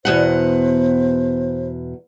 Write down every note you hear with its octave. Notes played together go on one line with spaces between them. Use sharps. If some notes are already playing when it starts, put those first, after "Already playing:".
E2 B2 C5 F#5